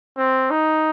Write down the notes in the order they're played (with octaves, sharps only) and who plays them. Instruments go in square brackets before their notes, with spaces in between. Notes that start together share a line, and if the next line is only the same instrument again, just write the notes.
[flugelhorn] C4
D#4